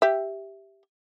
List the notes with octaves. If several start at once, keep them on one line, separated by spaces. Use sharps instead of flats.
G4 E5